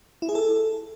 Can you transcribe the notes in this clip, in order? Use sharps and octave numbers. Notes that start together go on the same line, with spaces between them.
E4
G#4
A4